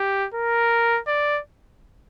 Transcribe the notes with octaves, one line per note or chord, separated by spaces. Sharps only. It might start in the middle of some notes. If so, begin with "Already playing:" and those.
Already playing: G4
A#4
D5